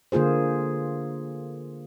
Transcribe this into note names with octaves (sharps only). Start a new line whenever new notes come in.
D3 A#3 F4 G#4 C5